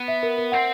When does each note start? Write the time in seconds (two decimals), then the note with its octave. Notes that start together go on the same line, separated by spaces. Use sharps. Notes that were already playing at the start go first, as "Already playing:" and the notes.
Already playing: B3
0.08 E5
0.23 A#4
0.38 A#4
0.52 C4 F#5